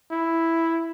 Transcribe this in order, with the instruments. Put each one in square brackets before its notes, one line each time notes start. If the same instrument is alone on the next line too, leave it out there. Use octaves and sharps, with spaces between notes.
[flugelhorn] E4